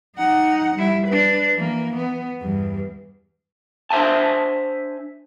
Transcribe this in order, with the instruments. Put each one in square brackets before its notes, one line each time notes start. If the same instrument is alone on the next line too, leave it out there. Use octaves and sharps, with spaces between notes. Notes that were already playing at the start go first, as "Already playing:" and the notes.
[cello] D#4 F#5
G3 E4
D4 B4
E3 A#3
B3
E2 G2
[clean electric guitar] D4 C5 E5 G#5 A5